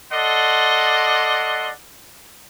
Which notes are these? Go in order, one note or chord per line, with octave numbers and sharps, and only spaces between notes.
A4 D5 D#5 F#5 C6